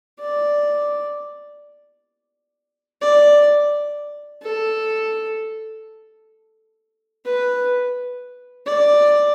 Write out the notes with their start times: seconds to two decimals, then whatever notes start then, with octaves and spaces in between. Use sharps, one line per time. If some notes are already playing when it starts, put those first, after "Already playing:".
0.20 D5
3.02 D5
4.43 A4
7.25 B4
8.66 D5